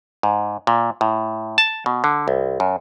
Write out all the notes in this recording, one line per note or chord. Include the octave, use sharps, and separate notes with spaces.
G#2
A#2
A2
A5
B2
D3
C2
F#2